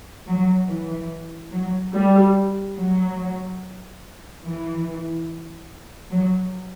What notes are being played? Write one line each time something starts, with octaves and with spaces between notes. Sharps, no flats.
F#3
E3
F#3
G3
F#3
E3
F#3